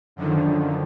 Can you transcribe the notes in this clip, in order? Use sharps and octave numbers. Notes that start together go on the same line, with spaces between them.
F#2 D3 D#3 F3